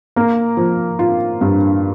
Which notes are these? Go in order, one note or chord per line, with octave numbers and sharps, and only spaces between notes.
A#3
F3
F4
G2